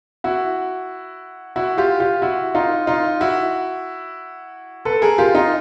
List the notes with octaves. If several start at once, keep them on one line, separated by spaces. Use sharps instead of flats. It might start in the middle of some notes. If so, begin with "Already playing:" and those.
E4 F#4
E4 F#4
F4 G4
F4 G4
E4 F#4
D#4 F4
D#4 F4
E4 F#4
A4 B4
G#4 A#4
F4 G4
D#4 F4